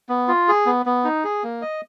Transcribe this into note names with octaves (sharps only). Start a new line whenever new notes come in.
B3
F4
G#4
B3
B3
D#4
G#4
A#3
D#5